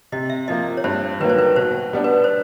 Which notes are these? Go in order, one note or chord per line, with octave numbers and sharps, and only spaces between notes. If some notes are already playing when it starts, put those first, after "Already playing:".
C3 D#5
E5
F3 A#3 D#5
C#5
G2 C5
D#3 F#3 A#3 B4
C5
B4
B2 C5
G3 B3 D4
B4
C5